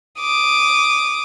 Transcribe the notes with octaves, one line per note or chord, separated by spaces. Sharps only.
D6 D#6